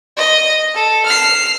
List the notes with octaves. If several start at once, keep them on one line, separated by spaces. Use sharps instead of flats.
D#5
A4
F6 C7